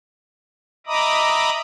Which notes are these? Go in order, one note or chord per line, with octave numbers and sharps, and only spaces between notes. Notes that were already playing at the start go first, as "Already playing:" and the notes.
D#5 E5 A#5 B5 D6 D#6